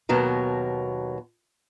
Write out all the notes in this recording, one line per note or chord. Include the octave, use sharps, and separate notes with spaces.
D#2 B2 F#3 A#4